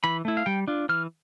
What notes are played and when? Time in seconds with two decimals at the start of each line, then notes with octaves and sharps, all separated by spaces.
0.04 E3 B5
0.25 A3 E4
0.37 F5
0.46 G3 G5
0.68 D4 F4
0.89 E3 F6